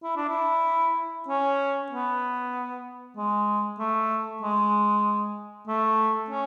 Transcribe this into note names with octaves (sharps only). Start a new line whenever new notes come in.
E4
D4
E4
C#4
B3
G#3
A3
G#3
A3
C#4